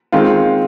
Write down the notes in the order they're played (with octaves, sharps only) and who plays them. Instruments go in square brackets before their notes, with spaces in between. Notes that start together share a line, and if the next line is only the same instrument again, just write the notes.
[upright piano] D#3 G#3 C4 F4